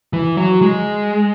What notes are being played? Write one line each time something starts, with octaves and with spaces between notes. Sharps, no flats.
E3
F#3
G#3